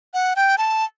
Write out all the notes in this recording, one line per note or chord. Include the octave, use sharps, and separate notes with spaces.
F#5
G5
A5